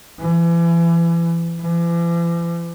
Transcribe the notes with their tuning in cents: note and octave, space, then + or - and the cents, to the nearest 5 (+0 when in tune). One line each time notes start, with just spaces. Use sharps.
E3 +35
E3 +45